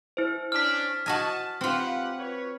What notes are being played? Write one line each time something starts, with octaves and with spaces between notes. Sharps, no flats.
E4 C5
C#4 D4 F6 B6
F#4 D#5 G#5 A5
C4 F4 G4 B4 F#5
B4 C#5